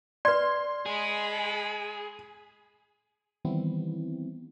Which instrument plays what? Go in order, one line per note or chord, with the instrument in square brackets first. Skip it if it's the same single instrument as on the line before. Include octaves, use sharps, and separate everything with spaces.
[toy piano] B4 D5 [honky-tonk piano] C6
[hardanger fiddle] G#3 B5 [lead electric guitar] G#4
[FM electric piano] D#3 E3 G3 B3 C4 E4